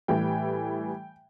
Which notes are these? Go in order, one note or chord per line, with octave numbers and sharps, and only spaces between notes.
A2 E3 G3 G5